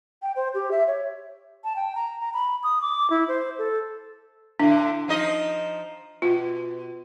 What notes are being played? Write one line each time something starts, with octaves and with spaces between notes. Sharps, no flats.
G5
C5
G4
E5
C#5
A5
G5
A#5
A#5
B5
D#6
D6
E4
C5
A4
A2 D3 D4
F3 D#4 D#5
B2 F4